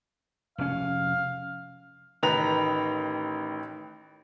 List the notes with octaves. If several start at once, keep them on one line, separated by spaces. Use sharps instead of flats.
F1 C#4 F5
A1 D#3 B4 A#5 B5 F7